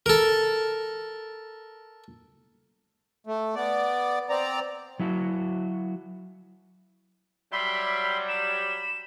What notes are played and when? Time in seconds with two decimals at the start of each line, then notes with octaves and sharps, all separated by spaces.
0.06 A4 A#4
3.27 A3
3.56 B3 D5
4.30 C4 D5 A#5
4.99 F#3 E4 F#4
7.52 F#3 G3 E5 B5 C6
8.28 B5 E7